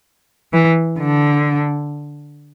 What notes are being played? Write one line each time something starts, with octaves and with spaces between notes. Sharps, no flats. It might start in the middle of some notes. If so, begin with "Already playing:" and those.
E3
D3